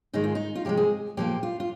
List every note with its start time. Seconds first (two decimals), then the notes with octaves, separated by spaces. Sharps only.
0.13 G#2 D#3 G#3 D#4
0.24 F4
0.35 D#4
0.55 F4
0.65 C3 F3 G#3 G4
0.77 G#4
1.17 A#2 F3 A#3 G4
1.43 F4
1.60 F4